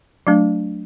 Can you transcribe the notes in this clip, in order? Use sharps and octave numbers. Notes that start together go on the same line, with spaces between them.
F#3 A3 D4